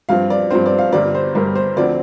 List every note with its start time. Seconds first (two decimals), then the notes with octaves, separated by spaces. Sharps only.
0.09 G2 F3 C4 F5
0.30 D5
0.51 G2 F3 C4 C5
0.66 D5
0.79 F5
0.93 G1 G2 G3 D5
1.15 C5
1.35 G1 G2 G3 A#4
1.56 C5
1.77 D2 D3 F3 C4 D5